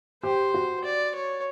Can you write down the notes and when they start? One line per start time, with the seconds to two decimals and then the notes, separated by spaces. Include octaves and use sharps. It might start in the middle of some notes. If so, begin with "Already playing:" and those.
0.23 G4 C5
0.54 F#4
0.84 D5
1.15 C#5